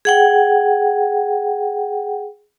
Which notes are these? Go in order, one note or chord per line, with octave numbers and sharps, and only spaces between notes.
G#4 F#5 G5